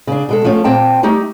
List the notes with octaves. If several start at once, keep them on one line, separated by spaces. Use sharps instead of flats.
C#3 D4
B2 G#3 A4
F3 A3 C#4 F4
A#2 C4 G5 A5
G3 A3 D#4 G4